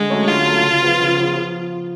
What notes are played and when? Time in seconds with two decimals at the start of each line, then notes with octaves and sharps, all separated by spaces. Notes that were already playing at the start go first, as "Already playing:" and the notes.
Already playing: D3 G#3
0.10 F#3 A3 C#4
0.28 D3 F4
0.45 F#3 A3 C#4
0.63 C#3
0.82 F3 B3
0.99 C#3
1.17 F3 B3
1.35 F3